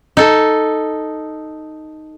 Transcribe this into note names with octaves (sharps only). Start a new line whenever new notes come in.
D#4 A4